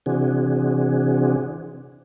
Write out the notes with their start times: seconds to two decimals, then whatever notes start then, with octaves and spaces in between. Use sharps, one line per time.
0.06 C3 E3 C4 D4 F#4 G#4